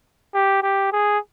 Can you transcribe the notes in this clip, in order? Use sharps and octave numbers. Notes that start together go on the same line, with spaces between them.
G4
G4
G#4